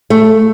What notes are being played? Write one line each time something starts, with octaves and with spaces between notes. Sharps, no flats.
A3